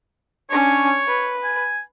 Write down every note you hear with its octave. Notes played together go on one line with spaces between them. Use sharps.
C#4 D4 C#5
B4
G#5